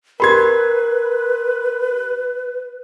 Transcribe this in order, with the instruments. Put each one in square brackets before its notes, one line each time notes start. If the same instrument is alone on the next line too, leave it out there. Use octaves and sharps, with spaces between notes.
[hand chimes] G4 A#4 [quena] B4 [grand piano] B5 C6 G#6